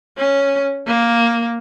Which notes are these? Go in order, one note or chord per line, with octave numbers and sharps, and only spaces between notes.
C#4
A#3